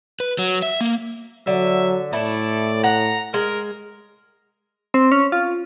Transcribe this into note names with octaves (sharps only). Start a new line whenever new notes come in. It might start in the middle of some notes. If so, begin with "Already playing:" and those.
B4
F#3
E5
A#3
D3 F#3 E5
A2 A3 E4 D5
F#5 A#5
G#3 A#4
C4
C#4
F4